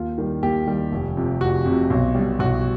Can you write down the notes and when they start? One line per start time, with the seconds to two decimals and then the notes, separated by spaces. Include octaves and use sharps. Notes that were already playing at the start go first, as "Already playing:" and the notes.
Already playing: D#2 F4
0.18 D#3 G3
0.43 D#2 G4
0.67 D#3 G3
0.92 F1
1.17 F2 C3
1.41 F1 F#4
1.66 F2 C3
1.90 B1
2.15 B2 G3
2.39 B1 F#4